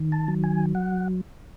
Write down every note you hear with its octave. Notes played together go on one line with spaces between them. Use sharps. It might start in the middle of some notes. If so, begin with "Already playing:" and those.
Already playing: D#3
A5
F#3
G#5
F#5